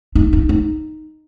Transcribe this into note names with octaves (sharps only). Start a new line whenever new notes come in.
D#4
D#4
D#4